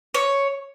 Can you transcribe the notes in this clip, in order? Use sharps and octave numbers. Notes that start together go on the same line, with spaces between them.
C#5